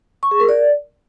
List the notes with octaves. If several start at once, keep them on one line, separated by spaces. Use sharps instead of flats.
C#6
G#4
A#4
D5